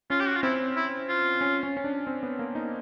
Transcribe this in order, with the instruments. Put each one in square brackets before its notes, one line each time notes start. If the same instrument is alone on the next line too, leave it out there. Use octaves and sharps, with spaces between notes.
[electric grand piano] C#4 [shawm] F4
[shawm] G4
F#4
F4
[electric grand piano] C4 [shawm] E4
[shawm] E4
F4
[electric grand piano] C#4
C#4
C#4
D4
C4
B3
A#3
D#4